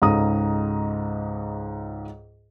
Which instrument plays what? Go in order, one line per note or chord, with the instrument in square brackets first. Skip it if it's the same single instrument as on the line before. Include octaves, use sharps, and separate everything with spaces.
[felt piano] C#2 G#2 A4 A#5 D#6